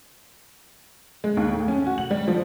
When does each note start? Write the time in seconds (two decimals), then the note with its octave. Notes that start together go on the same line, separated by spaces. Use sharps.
1.24 G#3
1.37 D#2
1.53 A2
1.68 C#4
1.86 F#4
1.98 F#7
2.11 G3
2.28 F3